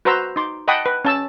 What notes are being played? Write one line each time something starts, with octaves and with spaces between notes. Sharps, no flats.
F#4 B4 C5 A#5 C6 E6
D#4 C6 D6
D#5 F#5 G5 A5 B5 D#6
B4
C#4 A5 E6